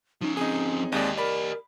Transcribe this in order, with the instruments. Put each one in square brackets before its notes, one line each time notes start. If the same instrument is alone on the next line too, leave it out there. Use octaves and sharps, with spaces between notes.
[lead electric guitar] F3 C#4 [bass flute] D#4
[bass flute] C4 [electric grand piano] D#4 G#4
[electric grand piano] D#2 G#3 D5 [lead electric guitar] G4 D#5
[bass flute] A#4 [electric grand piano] D5 B5